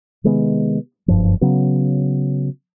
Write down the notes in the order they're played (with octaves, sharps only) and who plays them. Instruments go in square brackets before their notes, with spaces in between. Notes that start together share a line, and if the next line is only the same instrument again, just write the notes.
[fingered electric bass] C3 D#3 G#3 B3
F#1 G2 F3
C#3 F#3 B3